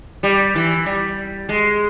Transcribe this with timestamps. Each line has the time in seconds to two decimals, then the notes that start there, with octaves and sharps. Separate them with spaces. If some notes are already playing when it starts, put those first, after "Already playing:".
0.23 G3
0.55 E3
0.86 G3
1.49 G#3